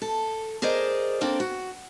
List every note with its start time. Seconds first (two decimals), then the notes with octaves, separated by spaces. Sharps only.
0.02 A4
0.62 G#4 A#4 C5 D5 D#5
1.21 A#3 C4 D4 A4 A#4
1.40 F#4